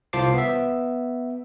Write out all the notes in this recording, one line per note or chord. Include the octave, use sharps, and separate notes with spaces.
C2 F4 C5 A5 D6 C7
B3 E5